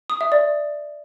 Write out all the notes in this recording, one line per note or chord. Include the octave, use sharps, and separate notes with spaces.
D#6
E5
D5